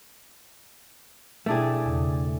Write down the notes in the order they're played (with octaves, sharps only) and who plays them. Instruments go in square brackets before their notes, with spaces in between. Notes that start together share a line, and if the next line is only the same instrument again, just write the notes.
[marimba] B2 E4 G5 [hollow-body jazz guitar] A3 D4 G#4
[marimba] E2 C#3